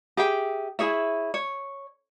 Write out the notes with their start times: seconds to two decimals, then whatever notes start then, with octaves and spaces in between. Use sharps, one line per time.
0.17 G4 G#4 E5 G5
0.79 E4 G#4 C#5 E5
1.34 C#5